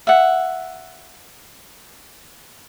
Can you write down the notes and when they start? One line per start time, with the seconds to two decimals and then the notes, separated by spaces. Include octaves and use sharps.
0.07 E5 F#5